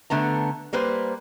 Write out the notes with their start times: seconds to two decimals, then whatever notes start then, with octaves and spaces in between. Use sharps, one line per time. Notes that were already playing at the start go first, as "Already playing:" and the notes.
0.10 D3 A3 B3 A#5
0.73 G3 A#3 B4 C5